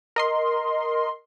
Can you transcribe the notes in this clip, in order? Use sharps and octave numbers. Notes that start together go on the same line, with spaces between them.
A#4 D#5 C6